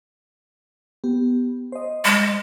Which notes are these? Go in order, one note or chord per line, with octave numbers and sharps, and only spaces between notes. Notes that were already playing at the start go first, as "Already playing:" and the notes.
B3 G4
C5 D#5
G#3